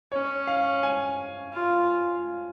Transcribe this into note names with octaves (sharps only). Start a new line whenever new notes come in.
C#4 C#5
F5
G#5
F4